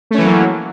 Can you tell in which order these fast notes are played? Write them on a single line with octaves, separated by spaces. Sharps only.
A3 C#4 E3 F#3 A#3